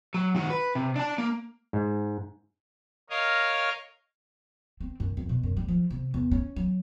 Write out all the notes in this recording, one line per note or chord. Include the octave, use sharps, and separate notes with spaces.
F#3
D#3 F#4
B4
C3
D4 A5
A#3
G#2
A#4 C#5 D#5 F5
C4
F#2
F2
B2
F#2
G3
F3
C3
E2
C#4
F#3